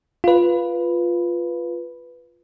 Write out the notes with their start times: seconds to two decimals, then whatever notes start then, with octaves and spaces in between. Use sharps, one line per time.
0.24 F4 B4